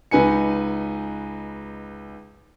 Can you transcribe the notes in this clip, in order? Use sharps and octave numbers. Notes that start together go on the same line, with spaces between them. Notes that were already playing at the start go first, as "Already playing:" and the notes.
C#2 D#4 B4 G#5 C#7